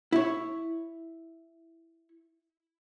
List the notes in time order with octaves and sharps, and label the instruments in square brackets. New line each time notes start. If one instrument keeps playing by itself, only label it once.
[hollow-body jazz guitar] E4 C#5